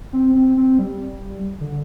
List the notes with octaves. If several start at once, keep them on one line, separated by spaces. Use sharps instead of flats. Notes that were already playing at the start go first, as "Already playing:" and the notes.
C4
C4
C4
G3
D3